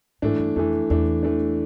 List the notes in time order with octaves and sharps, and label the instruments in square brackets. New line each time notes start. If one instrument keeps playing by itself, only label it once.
[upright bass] G#2 [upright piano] E3 A3 D4
[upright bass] G2
[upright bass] F2 [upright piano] E3 A3 D4
[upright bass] E2 [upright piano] E3 A3 D4
[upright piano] E3 A3 D4